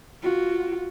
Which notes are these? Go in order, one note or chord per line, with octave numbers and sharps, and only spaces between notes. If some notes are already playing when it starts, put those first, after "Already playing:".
F4 F#4